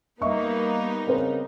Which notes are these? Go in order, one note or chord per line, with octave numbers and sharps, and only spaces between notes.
G3 A#3 B3 D#4 D#5 E5 C#6
C#3 C4 A#4 C5